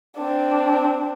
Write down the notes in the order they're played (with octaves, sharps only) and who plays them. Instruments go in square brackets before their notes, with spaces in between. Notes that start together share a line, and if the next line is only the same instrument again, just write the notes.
[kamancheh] C4 D4